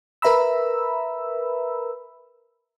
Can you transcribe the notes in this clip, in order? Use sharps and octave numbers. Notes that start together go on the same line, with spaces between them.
A#4 B4 E5 A#5 B5 E6